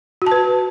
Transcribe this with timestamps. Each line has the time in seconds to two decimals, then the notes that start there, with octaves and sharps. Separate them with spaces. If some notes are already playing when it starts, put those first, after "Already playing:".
0.22 F#4
0.27 A5
0.31 B4